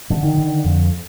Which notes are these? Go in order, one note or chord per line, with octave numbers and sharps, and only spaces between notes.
D3
D#3
D3
F2